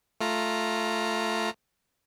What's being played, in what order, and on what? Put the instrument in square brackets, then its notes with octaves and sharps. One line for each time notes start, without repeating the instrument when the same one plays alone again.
[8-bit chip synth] A3 F4 A#5